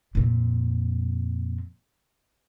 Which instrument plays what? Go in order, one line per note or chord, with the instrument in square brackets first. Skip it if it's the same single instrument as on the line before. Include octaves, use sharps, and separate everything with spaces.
[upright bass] F2 A#2